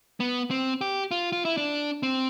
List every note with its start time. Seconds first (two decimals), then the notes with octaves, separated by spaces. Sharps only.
0.20 B3
0.51 C4
0.81 G4
1.11 F4
1.32 F4
1.45 E4
1.57 D4
2.03 C4